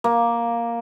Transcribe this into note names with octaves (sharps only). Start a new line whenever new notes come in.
A#3